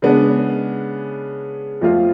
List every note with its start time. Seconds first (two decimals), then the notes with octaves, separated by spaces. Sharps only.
0.02 C#3 G#3 B3 D4
1.81 F2 F3 A3 F4